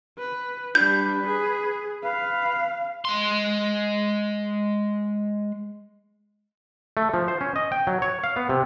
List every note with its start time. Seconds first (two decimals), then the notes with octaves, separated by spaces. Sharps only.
0.18 B4
0.75 G3 D4 B4 G6
1.27 G#4
2.04 B4 F5
3.05 G#3 C6
6.97 A3
7.14 F3
7.28 C5
7.41 C#4
7.56 D#5
7.72 G5
7.87 F#3
8.02 C#5
8.24 F5
8.36 B3
8.49 C3